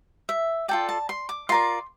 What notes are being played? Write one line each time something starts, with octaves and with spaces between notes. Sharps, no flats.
E5
F4 A4 D5 G5
A5
C6
D6
F4 A#4 D5 C6